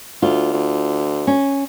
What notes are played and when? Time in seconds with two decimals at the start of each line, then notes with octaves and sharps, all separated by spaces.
0.22 D2 F4
0.53 D2
1.27 C#4